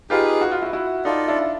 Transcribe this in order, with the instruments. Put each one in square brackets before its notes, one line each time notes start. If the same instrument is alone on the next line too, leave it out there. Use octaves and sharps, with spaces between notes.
[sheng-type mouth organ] D#4 G#4 B4 [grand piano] F4 G4
[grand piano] F#4
F4
E4 F#4
E4 F#4
[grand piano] D#4 [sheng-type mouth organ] F4 A4 D5
[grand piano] D4 E4